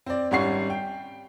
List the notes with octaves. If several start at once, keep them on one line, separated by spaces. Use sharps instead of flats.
C4 D5
G#1 G3 C#4 F#5 C#6 C7
G5